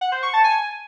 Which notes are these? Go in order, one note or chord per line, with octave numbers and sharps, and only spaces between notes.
F#5
C5
C#6
A5
G#5